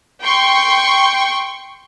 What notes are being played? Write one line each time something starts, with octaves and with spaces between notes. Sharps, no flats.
G5 C6 C#6